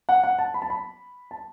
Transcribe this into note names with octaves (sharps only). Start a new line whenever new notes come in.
F#5
F#5
A5
B5
A5
B5
A5